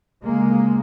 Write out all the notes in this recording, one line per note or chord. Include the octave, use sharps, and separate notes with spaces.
D2 C#3 G#3 A#3